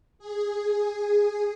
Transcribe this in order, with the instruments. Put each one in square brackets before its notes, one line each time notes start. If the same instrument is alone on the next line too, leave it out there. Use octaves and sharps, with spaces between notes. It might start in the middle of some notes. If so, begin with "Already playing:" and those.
[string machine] G#4